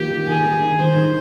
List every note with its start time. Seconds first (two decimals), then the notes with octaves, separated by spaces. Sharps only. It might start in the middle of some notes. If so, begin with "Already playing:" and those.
Already playing: D#3 A#3 F4 G4
0.11 D#3
0.28 D#3 G#4
0.45 D#3
0.62 D#4
0.79 D#3 C5
0.96 D#3